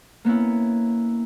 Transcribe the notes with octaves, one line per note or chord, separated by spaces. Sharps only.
A#3 B3 C#4 E4